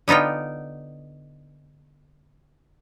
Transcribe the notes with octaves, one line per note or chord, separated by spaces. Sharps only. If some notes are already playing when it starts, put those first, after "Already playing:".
D3 B3 D#4 F4 G5